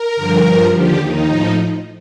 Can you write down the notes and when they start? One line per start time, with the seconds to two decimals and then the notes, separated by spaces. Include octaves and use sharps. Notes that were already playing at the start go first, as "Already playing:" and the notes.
Already playing: A#4
0.16 G2 D3 F3
0.44 G2 F3
0.72 D#2 D3 F3 G4
1.00 D#2 D#3 D#4
1.28 A2 F3